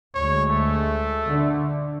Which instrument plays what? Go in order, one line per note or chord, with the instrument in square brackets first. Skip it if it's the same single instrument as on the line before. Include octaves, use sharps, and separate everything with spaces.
[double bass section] D2 G#3 [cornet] C#5
[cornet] A3
[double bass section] D3